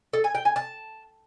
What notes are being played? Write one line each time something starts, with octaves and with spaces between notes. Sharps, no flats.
A4
G#5
G5
G#5
A5